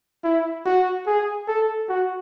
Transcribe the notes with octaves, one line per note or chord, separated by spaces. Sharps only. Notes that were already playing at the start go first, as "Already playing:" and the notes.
E4
F#4
G#4
A4
F#4